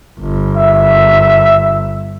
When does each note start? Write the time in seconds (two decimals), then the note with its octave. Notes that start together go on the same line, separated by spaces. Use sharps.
0.20 G1
0.57 E5